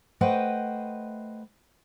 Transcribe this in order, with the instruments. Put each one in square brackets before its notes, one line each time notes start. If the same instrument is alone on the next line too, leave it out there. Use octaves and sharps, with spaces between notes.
[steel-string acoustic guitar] A3 B4 C5 D#5 F#5 G5